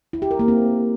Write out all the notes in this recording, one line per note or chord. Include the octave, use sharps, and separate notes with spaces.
E4
G4
A#4
A#3
C4